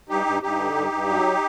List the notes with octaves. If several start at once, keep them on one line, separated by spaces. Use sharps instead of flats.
G2 D#4 G4
G2
G2 D#4 G4
D3
G2
G2
F#3